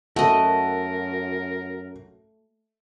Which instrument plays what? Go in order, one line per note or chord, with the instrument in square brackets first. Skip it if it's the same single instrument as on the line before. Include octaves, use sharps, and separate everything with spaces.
[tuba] F#2 [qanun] A3 D#5 [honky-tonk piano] F#4 [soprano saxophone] A#4